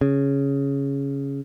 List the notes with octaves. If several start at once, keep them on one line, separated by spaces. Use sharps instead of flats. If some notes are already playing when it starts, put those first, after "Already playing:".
C#3